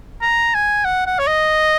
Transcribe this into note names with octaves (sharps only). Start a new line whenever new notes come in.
A#5
G#5
F#5
F#5
C#5
D#5